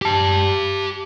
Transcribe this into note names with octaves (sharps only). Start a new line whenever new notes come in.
G4 A5